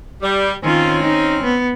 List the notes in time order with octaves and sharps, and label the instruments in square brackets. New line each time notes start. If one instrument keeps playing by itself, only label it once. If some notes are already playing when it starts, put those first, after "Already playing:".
[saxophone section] G3
[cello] D#3 F4 [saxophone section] C4 C#4
[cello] D#4
B3